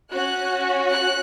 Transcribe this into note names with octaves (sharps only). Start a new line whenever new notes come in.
C#4 F#4 F#6
F#6